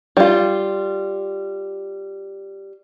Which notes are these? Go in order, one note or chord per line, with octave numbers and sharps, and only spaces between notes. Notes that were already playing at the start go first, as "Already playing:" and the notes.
G3 F4